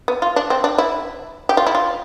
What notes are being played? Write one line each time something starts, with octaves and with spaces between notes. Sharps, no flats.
B3
F4
D4
C4
D4
E4
G4
F4
E4
F4